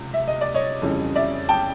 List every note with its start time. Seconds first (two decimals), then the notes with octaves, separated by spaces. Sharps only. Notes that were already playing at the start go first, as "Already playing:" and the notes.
Already playing: C#2 C3
0.14 E5
0.27 D#5
0.41 D5
0.54 C#5 D#5
0.82 F2 C#3 E3 G3
1.16 D5 E5
1.49 G5 A5